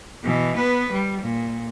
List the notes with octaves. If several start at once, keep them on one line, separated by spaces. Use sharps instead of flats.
B2 E3
B3 B4
G3
A#2